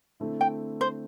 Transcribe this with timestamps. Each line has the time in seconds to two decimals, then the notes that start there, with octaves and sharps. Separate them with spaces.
0.20 D3 A3 C4 E4
0.41 G5
0.81 C5